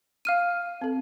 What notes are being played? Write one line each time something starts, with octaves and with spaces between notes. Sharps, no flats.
F5 F6 D#7
C4 A4